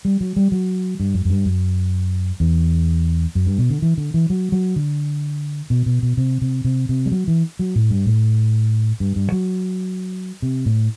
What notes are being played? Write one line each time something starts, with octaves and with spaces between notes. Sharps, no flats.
G3
F#3
G3
F#3
G2
F#2
F#2
G2
F#2
E2
F#2
G2
B2
D3
E3
D3
E3
F#3
F#3
D3
B2
B2
B2
C3
C3
C3
C3
G3
F#3
E3
F#3
A2
G2
A2
G2
G2
F#3
C3
A2